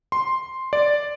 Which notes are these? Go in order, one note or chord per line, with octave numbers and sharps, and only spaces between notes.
C6
D5